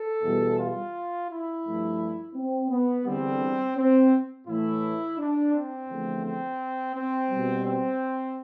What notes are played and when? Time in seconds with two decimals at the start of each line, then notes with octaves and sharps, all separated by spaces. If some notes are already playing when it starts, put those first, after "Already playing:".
Already playing: A4
0.23 E2 B2 G3
0.58 F4
1.29 E4
1.64 G2 F3 A3
2.35 C4
2.70 B3
3.05 E2 D3 G3 C4
3.77 C4
4.47 A2 E3 A3 E4
5.18 D4
5.53 C4
5.88 E2 D3 F3 A3
6.23 C4
6.95 C4
7.30 B2 G3
7.65 C4